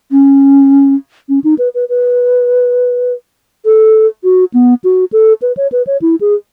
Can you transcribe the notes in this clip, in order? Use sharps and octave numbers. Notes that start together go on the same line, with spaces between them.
C#4
C#4
D#4
B4
B4
B4
A4
F#4
B3
F#4
A4
B4
C#5
B4
C#5
E4
G#4